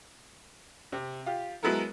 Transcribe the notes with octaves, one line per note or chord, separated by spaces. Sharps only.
C3
F4 G4
F#3 G#3 B3 E4 A4 A#4